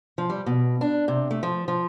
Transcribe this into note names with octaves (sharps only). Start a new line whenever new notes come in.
F3
G3
B2
D4
C3
A3
F3
F3